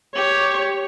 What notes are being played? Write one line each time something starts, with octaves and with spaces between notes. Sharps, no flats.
G4 C#5